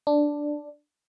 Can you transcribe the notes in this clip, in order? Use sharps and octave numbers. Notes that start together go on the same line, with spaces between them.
D4